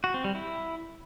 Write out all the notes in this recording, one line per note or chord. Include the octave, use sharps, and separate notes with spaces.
F#4
C4
G3
E4